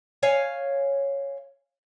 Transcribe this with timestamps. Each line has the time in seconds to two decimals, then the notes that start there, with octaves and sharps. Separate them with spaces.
0.23 C#5 F5 G#5